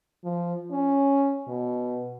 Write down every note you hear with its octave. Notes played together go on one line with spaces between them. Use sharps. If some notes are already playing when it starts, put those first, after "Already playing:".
F3
C#4
B2